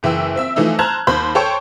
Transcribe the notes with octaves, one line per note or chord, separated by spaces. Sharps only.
F#1 E3 E5 G5 E6
C4 E5 E6
E3 F3 A3 D#4
C5 A5 A#5 F6 F#6 G#6
D#2 C5 B5 G6
A4 C5 C#5 G5 A5 C#6